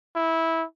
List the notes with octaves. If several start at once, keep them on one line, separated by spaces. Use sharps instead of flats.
E4